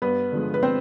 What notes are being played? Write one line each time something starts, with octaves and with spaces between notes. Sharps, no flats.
G2 B3 B4
D3 F3 G#3
B4
C4 C5